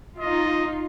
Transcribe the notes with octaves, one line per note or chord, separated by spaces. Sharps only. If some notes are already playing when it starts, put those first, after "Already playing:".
D#4 F4 D#5